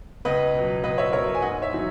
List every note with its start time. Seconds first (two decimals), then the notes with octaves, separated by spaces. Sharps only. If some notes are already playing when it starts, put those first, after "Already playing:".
0.25 C#2 B4 D#5
0.54 B2 F#3
0.84 C#2 B4 D#5
0.98 C#5 E5
1.13 B2 F#3 A#4 C#5
1.35 G#5
1.42 G#2 D#5 F#5
1.62 C#5 E5
1.72 D#3 F#3